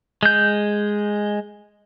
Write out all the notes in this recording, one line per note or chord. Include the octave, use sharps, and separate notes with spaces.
G#3 G6